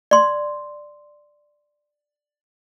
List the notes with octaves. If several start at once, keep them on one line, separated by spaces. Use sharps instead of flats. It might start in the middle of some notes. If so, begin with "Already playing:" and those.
D5 C6